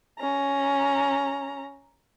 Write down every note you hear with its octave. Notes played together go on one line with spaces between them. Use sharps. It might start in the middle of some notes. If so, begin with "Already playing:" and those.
C#4 A#5